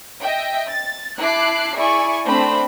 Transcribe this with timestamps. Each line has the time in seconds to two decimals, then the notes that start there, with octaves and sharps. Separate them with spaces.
0.21 D#5 E5 G5
0.69 A6
1.21 E4 A5 D6 F#6 C7
1.76 E4 G#4 D5 G#5 C#6
2.26 A3 C4 D4 C5 B5